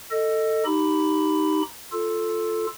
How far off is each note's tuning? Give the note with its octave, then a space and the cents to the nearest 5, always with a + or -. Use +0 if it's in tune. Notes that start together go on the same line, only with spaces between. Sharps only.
A4 +15 D#5 +0
D#4 +0 G4 -15 B5 +10
F4 +0 A4 +0